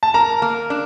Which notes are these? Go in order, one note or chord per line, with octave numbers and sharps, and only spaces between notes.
A5
A#4 A#5
A#3
D4